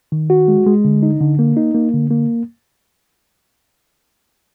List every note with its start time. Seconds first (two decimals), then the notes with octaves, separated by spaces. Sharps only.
0.12 D#3
0.30 F#4
0.48 G#3
0.66 G#3
0.85 D3
1.03 D#4
1.21 D3
1.39 A#3
1.57 D#4
1.75 A#3
1.94 D3
2.11 A#3